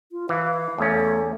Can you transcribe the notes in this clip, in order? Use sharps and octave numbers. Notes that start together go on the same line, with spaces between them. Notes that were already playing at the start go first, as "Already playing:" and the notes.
F4
E3 F5
E2 A3 C#4